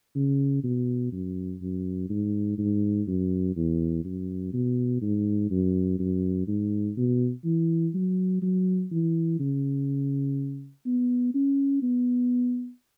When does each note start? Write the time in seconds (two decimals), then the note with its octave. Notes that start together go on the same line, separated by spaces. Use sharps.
0.16 C#3
0.64 B2
1.12 F#2
1.62 F#2
2.10 G#2
2.58 G#2
3.08 F#2
3.56 E2
4.05 F#2
4.53 B2
5.02 G#2
5.51 F#2
6.00 F#2
6.48 G#2
6.97 B2
7.45 E3
7.94 F#3
8.42 F#3
8.92 E3
9.40 C#3
10.86 B3
11.35 C#4
11.83 B3